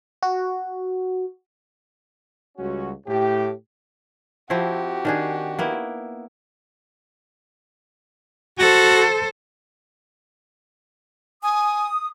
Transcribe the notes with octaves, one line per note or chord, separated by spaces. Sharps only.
F#4
C#2 G3 C#4 F#4
A2 G4
F3 C4 E4 F#4 G4
D#3 D4 G#4
A#3 B3 E4
F#4 A4 C5
G#5 D#6